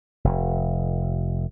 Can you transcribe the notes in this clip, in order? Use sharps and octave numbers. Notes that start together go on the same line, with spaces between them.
F1